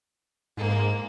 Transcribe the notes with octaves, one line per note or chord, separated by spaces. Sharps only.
G#2 A#3